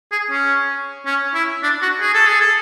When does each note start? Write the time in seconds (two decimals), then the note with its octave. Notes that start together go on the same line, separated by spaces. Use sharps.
0.12 G#4
0.31 C#4
1.06 C#4
1.34 E4
1.63 D4
1.82 F#4
2.01 G#4
2.14 A4
2.27 G#4
2.41 A4